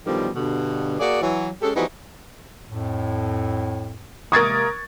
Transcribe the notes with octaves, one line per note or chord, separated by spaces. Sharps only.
F#2 B2 D3 D#3 F3 G3
G2 B2 D3
A#3 F#4 G#4 D5
E3 F#3
G#3 C#4 G4 A4
E3 F3 G3 B3 D#4 F#4
F2 A2
C3 G#3 A#3 A#4 C#6 D#6 G#6 A6